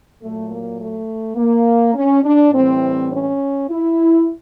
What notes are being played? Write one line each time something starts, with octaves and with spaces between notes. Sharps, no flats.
A#2 F#3 A3
A#3
A3
A#3
C#4
D4
A2 E3 G3 C4
C#4
E4